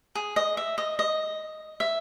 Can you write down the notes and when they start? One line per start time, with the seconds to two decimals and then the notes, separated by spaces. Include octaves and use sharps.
0.15 G#4
0.36 D#5
0.57 E5
0.78 D#5
0.99 D#5
1.80 E5